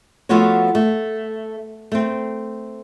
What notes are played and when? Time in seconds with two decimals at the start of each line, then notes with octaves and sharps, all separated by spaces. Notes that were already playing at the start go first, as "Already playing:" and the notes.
0.29 F3 A3 B3 F4 F#4 C#5
0.75 A3
1.92 A3 C4